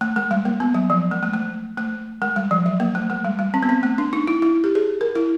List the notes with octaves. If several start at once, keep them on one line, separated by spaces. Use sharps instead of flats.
A3
G#3
G3
A#3
B3
F#3
F3
G#3
A3
A3
A3
G#3
G3
F3
F#3
A#3
A3
G#3
G3
G3
C4
B3
C4
A3
D4
D#4
E4
E4
G4
G#4
A#4
E4